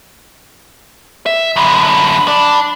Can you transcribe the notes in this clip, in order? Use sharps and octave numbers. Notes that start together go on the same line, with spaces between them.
E5
F#2 D3 B5
D4